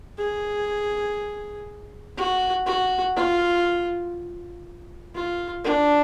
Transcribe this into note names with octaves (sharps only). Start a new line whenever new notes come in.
G#4
F#4
F#4
F4
F4
D4